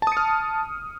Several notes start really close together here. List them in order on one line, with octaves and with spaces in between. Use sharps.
A5 D#6 C#7 F6